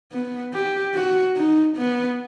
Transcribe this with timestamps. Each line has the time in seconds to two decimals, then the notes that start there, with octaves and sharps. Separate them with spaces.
0.13 B3
0.53 G4
0.94 F#4
1.36 D#4
1.77 B3